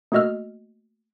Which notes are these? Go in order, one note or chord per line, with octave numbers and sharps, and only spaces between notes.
A3 A#3 F#4 D#5 E6 F6